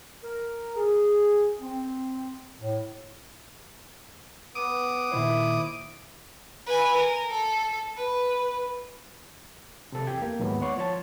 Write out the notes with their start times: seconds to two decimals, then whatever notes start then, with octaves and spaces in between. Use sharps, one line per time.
0.24 A#4
0.76 G#4
1.60 C4
2.60 A2
4.55 B3 D6 D#6
5.12 A#2 D#3 E4 C5
6.66 B4 G#5
6.96 A#4
7.31 A4
7.97 B4
9.92 C3 A4
10.07 E2 G4 G5 G#6
10.22 A#3
10.39 D#2 G#2 F#3 B3
10.61 C#5 D5 F#5 C6 C#6
10.77 F3 C#5 A5